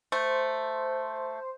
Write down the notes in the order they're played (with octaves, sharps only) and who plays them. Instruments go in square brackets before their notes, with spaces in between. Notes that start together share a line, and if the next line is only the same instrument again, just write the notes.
[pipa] A3 [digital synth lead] C5